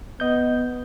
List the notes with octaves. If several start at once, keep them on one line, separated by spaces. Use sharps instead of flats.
B3 D#5 G6